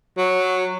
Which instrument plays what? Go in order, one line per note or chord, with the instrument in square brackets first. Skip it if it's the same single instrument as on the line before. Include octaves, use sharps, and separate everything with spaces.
[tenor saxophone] F#3